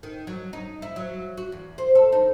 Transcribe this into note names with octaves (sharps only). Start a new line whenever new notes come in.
D#3
F#3
D#4
E4
F#3
F#4
E2
C5
A4
D#4